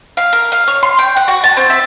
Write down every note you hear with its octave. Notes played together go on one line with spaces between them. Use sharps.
F5
A#4
F5
C#5
C6
G5
F#5
F#4
A5
C4
E5